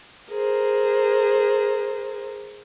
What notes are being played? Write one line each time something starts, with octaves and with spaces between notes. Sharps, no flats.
G#4 A#4 C5